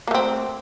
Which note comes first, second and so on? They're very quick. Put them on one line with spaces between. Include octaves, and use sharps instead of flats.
A#3 A3 C4